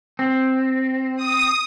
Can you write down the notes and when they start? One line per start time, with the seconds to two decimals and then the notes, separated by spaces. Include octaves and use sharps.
0.19 C4
1.17 D#6